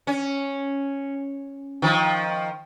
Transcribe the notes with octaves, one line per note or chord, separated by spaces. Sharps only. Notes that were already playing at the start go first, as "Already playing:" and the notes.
C#4
D#3 F3